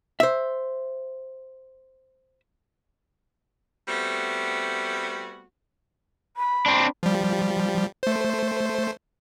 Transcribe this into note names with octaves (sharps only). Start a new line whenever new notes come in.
C5 E5
G3 A3 B3 C4 F#4
B5
C4 D4
F3 G3
A3 C5